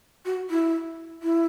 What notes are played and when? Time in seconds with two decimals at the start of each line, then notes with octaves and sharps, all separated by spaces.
0.25 F#4
0.50 E4
1.22 E4